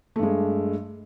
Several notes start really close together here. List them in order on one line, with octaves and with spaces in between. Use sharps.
A3 G2 G#3